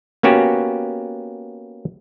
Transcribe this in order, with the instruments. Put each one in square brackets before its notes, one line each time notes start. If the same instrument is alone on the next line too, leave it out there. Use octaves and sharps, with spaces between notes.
[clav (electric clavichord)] A#3 B3 C#4 F#4 G4